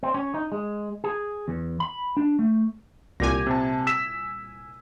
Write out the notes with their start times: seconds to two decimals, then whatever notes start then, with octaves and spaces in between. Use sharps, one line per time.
0.03 C4
0.14 C#4
0.34 D#4
0.52 G#3
1.04 G#4
1.48 E2
1.80 B5
2.17 D4
2.39 A3
3.20 C2 A#2 G4 G#5 A#6
3.47 C3 A5
3.87 E6 B6 E7